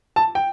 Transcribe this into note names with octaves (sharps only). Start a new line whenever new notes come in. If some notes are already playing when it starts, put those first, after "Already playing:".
A5
G5